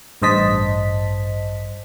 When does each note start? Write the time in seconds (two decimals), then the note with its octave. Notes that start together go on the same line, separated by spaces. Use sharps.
0.22 A1 G2 C5 D#5 A5 B6